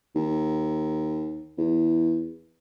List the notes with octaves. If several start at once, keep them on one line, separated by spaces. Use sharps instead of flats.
D#2
E2